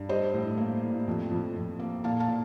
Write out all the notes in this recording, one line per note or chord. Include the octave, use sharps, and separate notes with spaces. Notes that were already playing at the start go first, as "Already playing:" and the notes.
Already playing: G2
G3 C5 D#5
A2
A#3
A2
F2
F2
F2
A#3
A#2 F5 A5
F5 A5
A#2